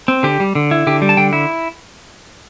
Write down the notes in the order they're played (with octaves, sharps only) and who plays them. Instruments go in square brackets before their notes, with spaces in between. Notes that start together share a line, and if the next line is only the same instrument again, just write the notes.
[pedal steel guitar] C4
D3 G4
G3
D3
E4
D3 G4
G3
A5
D3 G5
E4